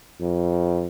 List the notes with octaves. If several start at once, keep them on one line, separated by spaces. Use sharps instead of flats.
F2